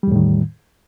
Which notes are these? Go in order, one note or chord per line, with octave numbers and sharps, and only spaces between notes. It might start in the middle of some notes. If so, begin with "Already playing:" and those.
E2 A2 D#3 G3